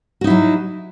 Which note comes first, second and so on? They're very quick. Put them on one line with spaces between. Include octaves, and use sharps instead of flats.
F#4 D#4 E4 F#3